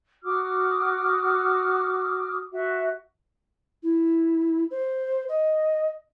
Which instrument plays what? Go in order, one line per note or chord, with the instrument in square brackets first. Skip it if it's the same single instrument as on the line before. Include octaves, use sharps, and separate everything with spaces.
[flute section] F#4 D6 D#6 F6
F#4 E5
[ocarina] E4
C5
D#5